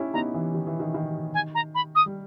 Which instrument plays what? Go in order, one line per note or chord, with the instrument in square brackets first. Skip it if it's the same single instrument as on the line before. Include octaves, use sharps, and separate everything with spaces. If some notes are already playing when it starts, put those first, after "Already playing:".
Already playing: [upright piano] C#4 D#4 E4 G4
[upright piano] B3 D#4 [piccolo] A#5
[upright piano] E3
D#3
E3
D#3
D#3
[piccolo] G#5
A#5
B5
D#6
[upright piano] G3